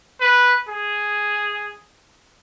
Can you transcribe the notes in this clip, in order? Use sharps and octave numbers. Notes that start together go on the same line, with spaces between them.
B4
G#4